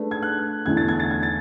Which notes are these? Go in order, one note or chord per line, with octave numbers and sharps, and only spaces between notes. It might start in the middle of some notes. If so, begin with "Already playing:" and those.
Already playing: A3 D4 G#4 B4
G#6
F#6
E2 D3 A3 E4 G#6
A6
G#6
A6
G#6
A6